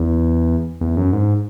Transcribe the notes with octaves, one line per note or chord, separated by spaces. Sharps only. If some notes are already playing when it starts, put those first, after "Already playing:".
Already playing: E2
E2
F#2
G#2